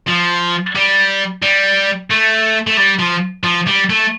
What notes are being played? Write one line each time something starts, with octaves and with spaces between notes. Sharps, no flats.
F3
G3
G3
A3
A3
G3
F3
F3
G3
A3